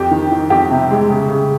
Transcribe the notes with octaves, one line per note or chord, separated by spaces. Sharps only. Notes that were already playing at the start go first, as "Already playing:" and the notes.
Already playing: F2 G4
D#3
D#3
F2 G4
C3
G#3
C#3
C#3